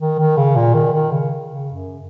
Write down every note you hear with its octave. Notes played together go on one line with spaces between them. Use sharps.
D#3
D#3
C#3
A#2
D#3
D#3
C#3
C#3
F#2